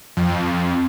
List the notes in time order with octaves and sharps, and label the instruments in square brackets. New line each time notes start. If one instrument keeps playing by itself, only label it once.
[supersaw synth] F2